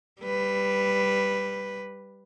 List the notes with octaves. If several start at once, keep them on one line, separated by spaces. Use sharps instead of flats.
G3 B4